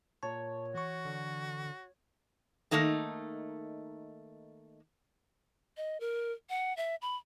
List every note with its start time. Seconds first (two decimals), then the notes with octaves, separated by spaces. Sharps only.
0.23 A#2 C#5 A5
0.75 E3 F#4 C#6
1.05 D3
2.71 D#3 A3 A#3 D#4 A4
5.77 D#5
6.00 A#4
6.50 F#5
6.77 E5
7.02 B5